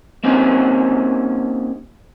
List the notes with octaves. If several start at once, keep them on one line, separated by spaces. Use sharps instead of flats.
A#3 C4 C#4 D#4 G4